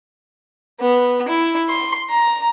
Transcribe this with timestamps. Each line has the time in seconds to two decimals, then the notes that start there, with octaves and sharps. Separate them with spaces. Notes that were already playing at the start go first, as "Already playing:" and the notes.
0.80 B3
1.28 E4
1.69 C6
2.10 A#5